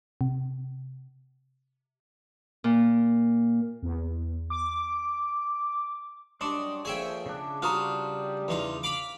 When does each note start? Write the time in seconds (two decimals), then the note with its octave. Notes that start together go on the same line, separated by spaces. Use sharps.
0.21 C3
2.64 A#2
3.82 E2
4.50 D6
6.41 F#2 G3 D4 D#5 C6 C#6
6.85 A#2 D3 F3 G#4 C#5 E5 G5
7.26 C#3 D4
7.62 G3 F4 F#4 C5 A#5 D#6 F6
8.48 E2 D#4 F4
8.83 F5 B5 D6